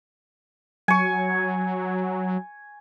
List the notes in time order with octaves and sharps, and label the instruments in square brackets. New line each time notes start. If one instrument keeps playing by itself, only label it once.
[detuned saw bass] F#3 [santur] G#5 C#6